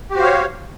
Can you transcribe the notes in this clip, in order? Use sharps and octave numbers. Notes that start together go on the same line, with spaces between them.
F#4 G4 C5 C#5 F5